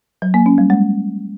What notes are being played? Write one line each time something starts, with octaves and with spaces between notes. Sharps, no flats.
F#3
A#3
C#4
G3
G#3